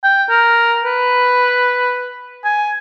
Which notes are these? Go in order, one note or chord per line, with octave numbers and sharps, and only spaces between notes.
G5
A#4
B4
G#5